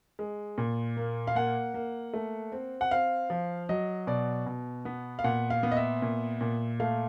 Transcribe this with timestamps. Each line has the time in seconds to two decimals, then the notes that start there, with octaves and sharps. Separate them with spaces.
0.19 G#3
0.58 A#2
0.97 A#3
1.27 F5
1.35 A#3 F#5
1.74 A#3
2.14 A3
2.52 C4
2.81 F#5
2.91 C4 F5
3.30 F3
3.69 F#3 D#5
4.07 B2 D5
4.46 B2
4.85 B3
5.19 F5
5.24 A#2 F#5
5.50 F5
5.63 B3
5.72 D#5
5.77 E5
6.02 A#2
6.41 A#2
6.80 A3 F5